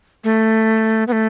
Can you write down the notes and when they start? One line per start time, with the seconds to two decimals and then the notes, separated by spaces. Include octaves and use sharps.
0.24 A3
1.08 B3
1.12 A3